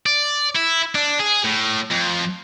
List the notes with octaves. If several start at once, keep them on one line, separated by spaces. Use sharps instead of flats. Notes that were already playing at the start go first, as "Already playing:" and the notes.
D5
E4
D4
G#4
A2
F2